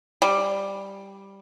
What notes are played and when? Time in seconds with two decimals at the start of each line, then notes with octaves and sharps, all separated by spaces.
0.22 G3